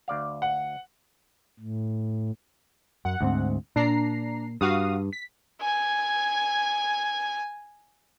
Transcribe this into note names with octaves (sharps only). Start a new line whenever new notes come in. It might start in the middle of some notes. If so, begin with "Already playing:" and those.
D2 D5 F5
F#5
A2
F#2 F#5
D2 G#2 C4
A#2 D4 A#5 C7
G2 F#4 F5 D#6
B6
G#5 G#6